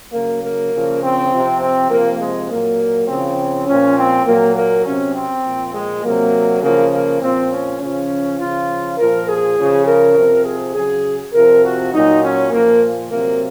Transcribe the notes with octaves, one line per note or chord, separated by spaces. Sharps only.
C#3 F#3 A#3
A#3
C#3 F3
C4
C3 F3
C4
C3 F3 A#3
G#3
A#2 F#3 A#3
C#3 F3 C4
A#2 F3 C#4
C4
A#2 F#3 A#3
A#3
C3 F#3 C#4
C4
A#2 F3
G#3
C3 F#3 A#3
C#3 F3 A#3
A#3
A#2 F3 C4
C#4
C#3 F3 C#4
C#3 F3 F4
A#2 F3 A#4
G#4
C#3 F3
A#4
C3 F3
G#4
C#3 F#3 G#4
C3 F3 A#4
F#4
A#2 F#3 D#4
C#4
A#2 F3 A#3
C3 F#3 A#3